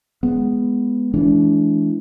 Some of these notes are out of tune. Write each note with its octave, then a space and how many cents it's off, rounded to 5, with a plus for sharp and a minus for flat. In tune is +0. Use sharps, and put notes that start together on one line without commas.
G#3 +0 B3 +0
E3 +0 G#3 +40 D4 -30